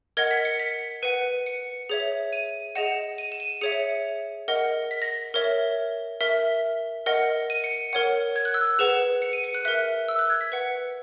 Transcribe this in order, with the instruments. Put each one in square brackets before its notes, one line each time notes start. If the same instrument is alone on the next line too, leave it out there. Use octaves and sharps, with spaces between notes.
[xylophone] A#4 D#5 F#5 G#6
B6
C#7
B6
B4 F#5 D#7
C#7
G#4 C#5 E5
D#7
G#4 D#5 F#5 E7
D#7
E7
D#7
G#4 C#5 E5 C#7
A#4 D#5 F#5
B6
A#6
A#4 C#5 E5
A#4 E5 B6
A#4 D#5 F#5
D#7
C#7
A#4 C#5 F#5
G#6
F#6
E6
F#6
G#4 B4 F#5 E7
C#7
D#7
C#7
F#6
A#4 E5 F#6
E6
F#6
G#6
B6
B4 F#5